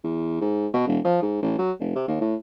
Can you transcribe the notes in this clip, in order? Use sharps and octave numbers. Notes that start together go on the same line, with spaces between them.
E2
G#2
B2
E1
F3
G#2
A1
F#3
F1
C3
D#2
A2